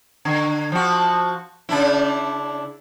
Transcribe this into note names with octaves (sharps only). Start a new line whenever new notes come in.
D3
F3 F#4
C#3 D4 E4